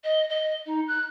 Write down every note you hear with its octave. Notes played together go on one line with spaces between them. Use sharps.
D#5
D#5
D#4
F#6